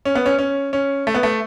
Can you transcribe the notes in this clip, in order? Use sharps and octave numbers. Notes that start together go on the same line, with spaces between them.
C#4
B3
C#4
C#4
C#4
A3
B3
A3